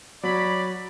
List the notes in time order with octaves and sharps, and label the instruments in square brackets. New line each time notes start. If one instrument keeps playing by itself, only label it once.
[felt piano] F#3 [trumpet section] C#5 D5 B5